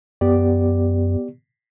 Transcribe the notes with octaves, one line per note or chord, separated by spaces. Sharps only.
F#2 B3 G4 D5